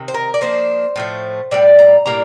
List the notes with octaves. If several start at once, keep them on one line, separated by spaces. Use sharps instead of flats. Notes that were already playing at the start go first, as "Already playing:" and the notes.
Already playing: C3 D#3
C5
A#4
D5
F3 A#3 D4 C5
A2 F3 A3
A2 G3 D4 D5
A#5
A2 G3 A#3 D4 A#5